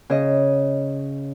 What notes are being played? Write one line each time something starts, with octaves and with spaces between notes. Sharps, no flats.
C#3 D#5